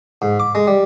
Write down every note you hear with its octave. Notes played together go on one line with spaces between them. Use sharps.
G#2
D6
G#3
G3